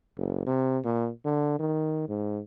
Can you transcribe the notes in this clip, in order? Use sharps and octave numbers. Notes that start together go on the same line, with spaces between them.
F#1
C3
A#2
D3
D#3
G#2